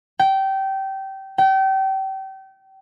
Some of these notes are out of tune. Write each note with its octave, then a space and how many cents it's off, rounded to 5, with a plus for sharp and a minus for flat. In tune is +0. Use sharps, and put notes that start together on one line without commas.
G5 -20
G5 -30